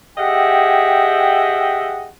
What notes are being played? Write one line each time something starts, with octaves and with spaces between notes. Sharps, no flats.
G4 G#4 D#5 E5 F#5 G5